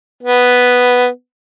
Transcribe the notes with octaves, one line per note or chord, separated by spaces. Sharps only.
B3